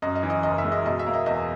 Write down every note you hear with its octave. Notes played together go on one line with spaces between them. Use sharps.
F#2 D#5
D#5
E3
D#5
F#1 D#5
E5
G#3
D#5
B2 D#5
E5
A#3
D#5
E2 D#5